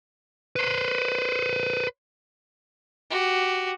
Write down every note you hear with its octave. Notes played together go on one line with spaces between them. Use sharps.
B4 C5
F#4 G4